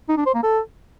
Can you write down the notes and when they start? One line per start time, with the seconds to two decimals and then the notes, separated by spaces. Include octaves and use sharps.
0.09 D#4
0.17 D4
0.26 C5
0.35 A#3
0.43 A4